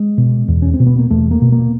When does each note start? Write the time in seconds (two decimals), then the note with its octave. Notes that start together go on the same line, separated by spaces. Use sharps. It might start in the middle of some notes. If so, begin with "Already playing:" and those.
Already playing: G#3
0.18 B2
0.48 E2
0.62 C#4
0.74 C4
0.80 B2
0.87 B3
0.99 A#3
1.10 E2 A3
1.31 A#3
1.41 B2
1.52 A#3